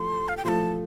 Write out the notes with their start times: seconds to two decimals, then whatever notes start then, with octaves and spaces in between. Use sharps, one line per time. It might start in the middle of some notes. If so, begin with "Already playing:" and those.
Already playing: F3 A3 A4 C6
0.28 F5
0.37 G5
0.45 F3 A3 F4 A4 A5 C6